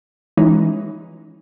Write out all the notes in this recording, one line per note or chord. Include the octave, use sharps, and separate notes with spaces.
E3 G#3 C#4 D#4